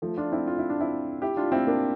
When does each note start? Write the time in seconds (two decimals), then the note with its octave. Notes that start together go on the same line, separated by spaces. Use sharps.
0.02 F3 A3
0.17 D4 F4
0.32 C4 E4
0.47 F4
0.59 E4
0.69 D4
0.80 C4 E4
1.22 E4 G4
1.37 D4 F4
1.52 C4 E4
1.67 A#3 D4